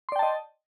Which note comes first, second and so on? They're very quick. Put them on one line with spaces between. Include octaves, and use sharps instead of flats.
C6 D5 G5 A5 D#5